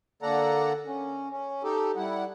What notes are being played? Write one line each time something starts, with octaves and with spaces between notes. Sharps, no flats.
D3 A#3 A4 D5 F#5 A#5
C#4
C#4
D#4 G4 A4
G3 E4 F#5